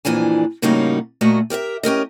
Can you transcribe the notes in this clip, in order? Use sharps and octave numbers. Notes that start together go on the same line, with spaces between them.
F2 A#2 E3 D4 G#5
A2 C#3 G3 A#3 D#4 F#4
A#2 A3 A#3 F#4 D#5
G4 A#4 D#5 E5
C#4 G4 A#4 D#5